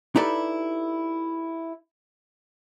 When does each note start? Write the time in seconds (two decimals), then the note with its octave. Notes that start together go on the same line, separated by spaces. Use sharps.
0.15 D#4 E4 G4 A4 B4 D5